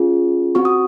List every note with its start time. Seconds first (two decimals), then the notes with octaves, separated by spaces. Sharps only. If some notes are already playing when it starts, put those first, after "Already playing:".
Already playing: C#4 F4 G#4
0.55 C4 F#4 C#6
0.65 D#6